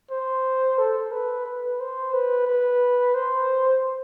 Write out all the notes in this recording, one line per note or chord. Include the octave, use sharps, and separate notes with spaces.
C5
A4
B4
B4
C5
B4
B4
C5